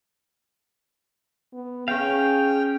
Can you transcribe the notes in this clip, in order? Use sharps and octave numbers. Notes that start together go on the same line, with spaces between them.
B3
C#4 G#4 F5 G5